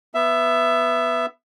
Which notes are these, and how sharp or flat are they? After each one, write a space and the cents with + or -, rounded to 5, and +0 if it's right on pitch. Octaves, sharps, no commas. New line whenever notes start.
B3 +0 E5 +15